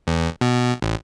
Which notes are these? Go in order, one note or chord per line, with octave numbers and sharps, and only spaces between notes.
E2
B2
A1